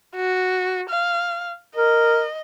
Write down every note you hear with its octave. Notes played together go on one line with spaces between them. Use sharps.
F#4
F5
A#4 D#5